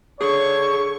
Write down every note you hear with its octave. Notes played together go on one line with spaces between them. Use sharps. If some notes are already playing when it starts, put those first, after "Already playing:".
D3 G#4 C#5 C#6